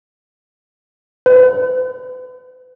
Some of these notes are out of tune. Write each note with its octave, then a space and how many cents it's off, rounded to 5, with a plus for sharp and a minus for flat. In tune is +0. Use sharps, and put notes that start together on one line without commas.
B4 +45